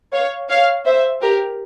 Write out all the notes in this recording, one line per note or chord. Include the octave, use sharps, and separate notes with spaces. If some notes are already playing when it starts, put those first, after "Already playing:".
C#5 F5
C#5 F5
C5 E5
G4 A#4